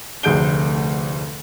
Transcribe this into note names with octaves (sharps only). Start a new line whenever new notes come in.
F1 D2 G#4 G6 D7 G7